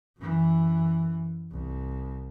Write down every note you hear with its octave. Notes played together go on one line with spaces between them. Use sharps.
F#2 E3
C2